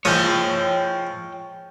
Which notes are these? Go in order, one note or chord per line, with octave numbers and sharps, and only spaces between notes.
F3 G#3 C#5 G5 D#6